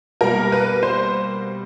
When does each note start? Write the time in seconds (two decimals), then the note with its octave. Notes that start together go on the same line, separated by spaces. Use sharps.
0.21 B2 G3 A#3 A#4
0.52 B4
0.83 C5